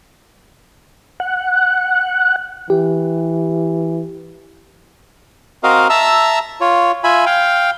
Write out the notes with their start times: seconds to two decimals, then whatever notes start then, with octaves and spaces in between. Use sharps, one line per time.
1.20 F#5
2.70 E3 G4
5.63 C4 F#4 A#4 D#5 F5
5.90 E5 A5 A#5 E6
6.61 F4 C#5
7.04 F4 E5 G#5 B5
7.26 F5 G5